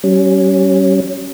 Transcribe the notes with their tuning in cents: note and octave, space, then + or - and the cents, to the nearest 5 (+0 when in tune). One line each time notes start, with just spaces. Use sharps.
G3 -45 C#4 +0